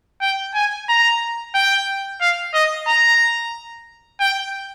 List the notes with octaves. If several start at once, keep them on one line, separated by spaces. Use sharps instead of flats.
G5
G#5
A#5
G5
F5
D#5
A#5
G5